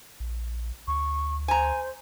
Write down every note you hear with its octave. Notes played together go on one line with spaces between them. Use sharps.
A#1
D2 C#6
C5 G#5 A#5